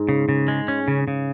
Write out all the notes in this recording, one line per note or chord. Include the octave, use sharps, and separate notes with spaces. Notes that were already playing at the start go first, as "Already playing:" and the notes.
Already playing: G#2
C#3
C#3
G#3
C#4
C#3
C#3